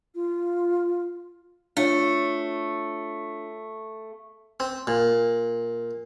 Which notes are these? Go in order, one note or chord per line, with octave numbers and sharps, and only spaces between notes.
F4
A3 D4 F4 C#5
C4
A#2